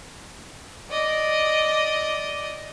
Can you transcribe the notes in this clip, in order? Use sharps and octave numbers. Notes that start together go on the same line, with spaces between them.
D5 D#5